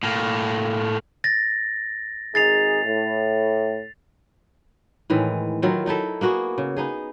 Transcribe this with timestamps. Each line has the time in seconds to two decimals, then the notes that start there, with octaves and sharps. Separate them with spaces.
0.03 A2 A#3
1.24 A6 A#6
2.35 G#1 D#4 G#4 A6 C7 F7
2.85 A2
5.10 A2 D#3 E3 G#3
5.62 D#3 F#3 E4 F4
5.86 F#3 D#4 E4 A4
6.21 A#3 B3 F#4 G#4
6.58 C#3
6.77 B3 D#4 G#4